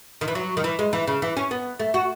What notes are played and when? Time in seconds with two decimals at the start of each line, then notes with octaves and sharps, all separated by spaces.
0.21 D#3
0.28 E3
0.35 F#3
0.57 D#3
0.64 E3
0.79 G#3
0.93 E3
1.07 C#3
1.22 E3
1.37 C#4
1.51 B3
1.80 A3
1.94 F#4